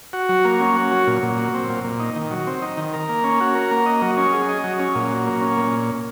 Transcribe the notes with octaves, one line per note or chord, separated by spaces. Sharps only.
F#4
F#3
A#3
C#4
F#4
F#3
A#2
A#2
F#3
C4
A#2
A#2
D#4
D#3
F#3
C4
D#4
D#3
A#4
A#3
C#4
F#4
A#4
A#3
D#5
F#3
C#4
G#4
D#5
F#3
C#4
A#2
F#3
A#3
C#4
A#2